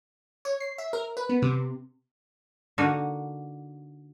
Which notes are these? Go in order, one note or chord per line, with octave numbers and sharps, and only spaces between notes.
C#5
C7
E5
A#4
B4
B3
C3
D3 A#3 D#4 F#4